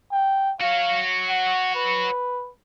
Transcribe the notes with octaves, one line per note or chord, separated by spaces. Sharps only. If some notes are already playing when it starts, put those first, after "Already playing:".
G5
F#4 C#5 F5
F#5
B4